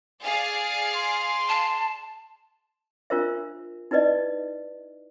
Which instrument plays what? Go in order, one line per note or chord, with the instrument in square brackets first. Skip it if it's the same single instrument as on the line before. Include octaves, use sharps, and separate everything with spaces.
[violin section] G#4 D5 F5
[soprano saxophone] C6
[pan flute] A5
[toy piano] D4 F4 A#4 C5 E5
D#4 E4 B4 D5 D#5